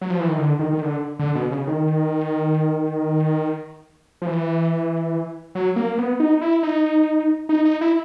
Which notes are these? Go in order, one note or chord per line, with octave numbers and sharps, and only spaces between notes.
F#3
F3
E3
D#3
D3
D#3
D#3
D3
D3
B2
C#3
D#3
F3
E3
F#3
A#3
B3
D#4
E4
D#4
D#4
D#4
E4